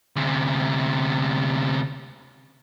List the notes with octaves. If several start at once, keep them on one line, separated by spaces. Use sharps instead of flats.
D2 C3